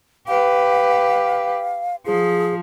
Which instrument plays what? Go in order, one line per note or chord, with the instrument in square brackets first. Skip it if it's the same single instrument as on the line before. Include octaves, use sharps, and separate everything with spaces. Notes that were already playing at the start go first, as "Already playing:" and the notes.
[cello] G4 B4 [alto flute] F5
[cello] F3 [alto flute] G#4